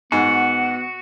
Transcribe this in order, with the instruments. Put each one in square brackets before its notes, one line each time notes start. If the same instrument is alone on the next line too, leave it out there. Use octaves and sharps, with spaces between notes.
[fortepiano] G#2 [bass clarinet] B3 [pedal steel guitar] F#4